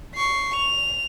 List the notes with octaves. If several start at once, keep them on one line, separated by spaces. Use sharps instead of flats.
C#6 C7
F7